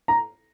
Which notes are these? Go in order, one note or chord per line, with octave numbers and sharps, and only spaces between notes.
A#5